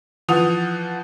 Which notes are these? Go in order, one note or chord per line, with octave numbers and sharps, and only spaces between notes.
E3 F3 F#5 D#6 F7